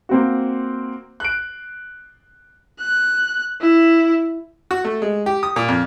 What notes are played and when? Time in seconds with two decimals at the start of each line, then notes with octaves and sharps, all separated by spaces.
0.09 A#3 C4 F#4
1.20 F#6 D7
2.80 F#6
3.61 E4
4.71 F#4
4.84 A3
5.02 G#3
5.26 G4
5.43 D#6
5.56 A#2
5.68 F2